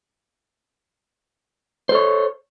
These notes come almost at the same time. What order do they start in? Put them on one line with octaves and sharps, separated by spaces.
C5 A4 C#5